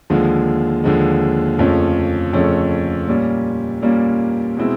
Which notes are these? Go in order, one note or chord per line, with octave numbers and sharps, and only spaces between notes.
D#2 D3 F3 G#3
D#2 D3 F3 G#3
F2 C#3 F3 A3 C#4
F2 C#3 F3 A3 C#4
A#2 G3 A#3 C#4
A#2 G3 A#3 C#4
B2 G#3 C4 E4